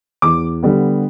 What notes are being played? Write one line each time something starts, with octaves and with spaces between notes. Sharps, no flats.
E2 D6
D3 G3 B3